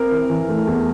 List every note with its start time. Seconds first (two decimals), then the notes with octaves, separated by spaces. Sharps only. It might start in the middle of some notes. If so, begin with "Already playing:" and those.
Already playing: C4 A#4
0.11 E3
0.30 E3
0.49 A3
0.67 E2